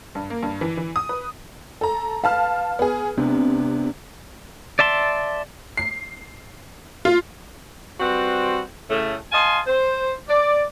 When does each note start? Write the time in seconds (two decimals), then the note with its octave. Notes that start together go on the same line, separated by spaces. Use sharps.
0.15 G2
0.30 A#3
0.43 G2
0.61 E3
0.77 E3
0.96 D#6
1.09 B4
1.81 A4 A#5
2.24 B4 F5 A5 F6
2.79 B3 G#4
3.18 C3 B3 C4 D4
4.79 D5 E5 A5 C6
5.77 C7
7.05 F4
8.00 G3 C4 F#4 B4 C5
8.89 A2 C#3 A3
9.32 D#5 F5 G#5 A5 C6
9.67 C5
10.29 D5